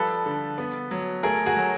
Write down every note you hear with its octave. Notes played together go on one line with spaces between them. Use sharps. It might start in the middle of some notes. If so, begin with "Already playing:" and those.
Already playing: F3 G3 A4 B4
D3
B3
F#3
A3 G#4 A#4
F#4 G#4
F#3